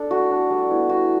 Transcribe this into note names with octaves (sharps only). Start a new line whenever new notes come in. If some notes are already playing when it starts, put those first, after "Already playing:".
Already playing: D4 A4
A3 F#4
D4
G3
B3 E4
G3 F#4